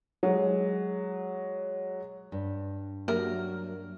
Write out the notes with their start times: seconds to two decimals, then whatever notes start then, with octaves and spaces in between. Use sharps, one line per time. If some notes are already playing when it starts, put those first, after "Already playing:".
0.23 F#3 G#3
2.32 G2
3.08 F#3 A#3 G4 A#4 E5